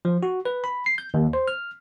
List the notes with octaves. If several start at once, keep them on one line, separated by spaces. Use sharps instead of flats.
F3
F#4
B4
B5
C7
G6
D#2
C5
F6